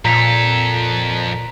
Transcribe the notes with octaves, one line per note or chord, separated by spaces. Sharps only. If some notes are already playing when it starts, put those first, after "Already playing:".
F2 A#2 A4 A#5 B6 F7